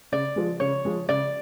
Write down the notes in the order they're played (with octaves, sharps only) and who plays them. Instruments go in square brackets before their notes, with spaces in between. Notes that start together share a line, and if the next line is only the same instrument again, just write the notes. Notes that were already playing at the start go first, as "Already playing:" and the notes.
[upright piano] C#3 [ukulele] D5
[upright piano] F3 G#3
[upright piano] C#3 [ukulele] C#5
[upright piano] F3 G#3
[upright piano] C#3 [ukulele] D5